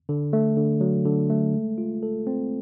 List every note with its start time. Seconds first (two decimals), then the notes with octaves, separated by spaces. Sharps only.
0.09 D3
0.33 A3
0.57 D3
0.81 F#3
1.05 D3
1.30 A3
1.54 G#3
1.78 F4
2.03 A4
2.27 C4